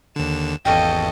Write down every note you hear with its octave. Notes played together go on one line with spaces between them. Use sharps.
D#2 D3 E7
G#1 E2 A#3 C#4 G4 A4 D#5